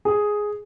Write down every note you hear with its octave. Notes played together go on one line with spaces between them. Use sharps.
G#4